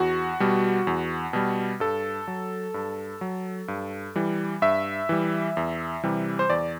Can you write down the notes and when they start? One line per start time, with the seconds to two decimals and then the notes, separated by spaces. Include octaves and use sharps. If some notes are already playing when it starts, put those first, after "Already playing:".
Already playing: E2 F#4
0.40 B2 G3
0.87 E2
1.33 B2 G3
1.80 G2 A4
2.27 F#3
2.74 G2
3.21 F#3
3.68 G2
4.16 E3 G3
4.62 G2 E5
5.09 E3 G3
5.57 E2
6.03 C3 E3 G3
6.39 C5
6.50 E2 D5